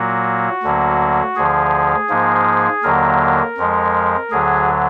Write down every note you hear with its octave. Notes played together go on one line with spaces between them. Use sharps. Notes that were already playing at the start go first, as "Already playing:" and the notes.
Already playing: A#2 F#3 A#3 F#4
D2 D3 F#3 A#3
D2 D3 F3 G#4
G#2 F3 A#3
D#2 D3 F#3 A#3 A#4
F2 F3 G#3
D2 D3 F#3 G#4